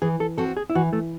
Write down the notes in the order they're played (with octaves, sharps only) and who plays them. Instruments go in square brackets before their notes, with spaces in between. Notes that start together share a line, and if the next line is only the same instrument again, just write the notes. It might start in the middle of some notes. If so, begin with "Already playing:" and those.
[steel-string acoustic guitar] E3 [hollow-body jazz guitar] G#4
[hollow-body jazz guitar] A4
[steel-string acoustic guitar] C4 F#4 [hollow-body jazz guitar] A4
[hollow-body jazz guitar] G#4
E4
[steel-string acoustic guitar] E3 [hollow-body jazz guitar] F#4
[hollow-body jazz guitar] A3